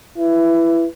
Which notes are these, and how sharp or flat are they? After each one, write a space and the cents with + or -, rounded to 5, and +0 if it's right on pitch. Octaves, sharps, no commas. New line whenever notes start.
E4 +20 B4 +0